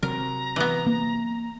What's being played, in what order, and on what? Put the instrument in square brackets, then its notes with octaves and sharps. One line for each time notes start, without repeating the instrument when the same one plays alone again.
[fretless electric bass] C3 F#3 [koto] A#4 [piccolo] A#5
[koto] E3 B3
[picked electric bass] A#3